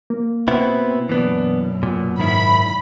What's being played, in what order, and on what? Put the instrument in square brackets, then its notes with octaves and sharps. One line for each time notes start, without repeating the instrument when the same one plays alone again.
[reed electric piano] A#3
[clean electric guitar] B2 B3 E4 [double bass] C4
[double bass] F#2 B2 [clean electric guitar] E3 B3 D4
[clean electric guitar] A#2
[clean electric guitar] G#2 D#3 E4 [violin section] B5